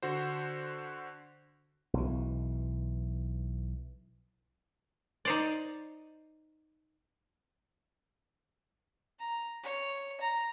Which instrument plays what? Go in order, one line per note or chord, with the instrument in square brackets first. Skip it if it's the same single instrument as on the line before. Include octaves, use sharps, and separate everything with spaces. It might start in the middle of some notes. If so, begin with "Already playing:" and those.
[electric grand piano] D3 F#4 C5
[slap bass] B1 E3
[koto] D#4 C5 D5
[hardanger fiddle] A#5
C#5
A#5